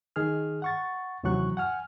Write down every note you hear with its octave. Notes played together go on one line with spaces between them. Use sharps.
D#3 G#4 F6
F#5 C#6 A6
D#2 C3 E3 F#3 C#6 F#6
F#5 G#5 F6